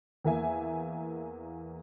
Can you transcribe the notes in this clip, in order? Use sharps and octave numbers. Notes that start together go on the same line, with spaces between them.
E2 A#3 E5 G#5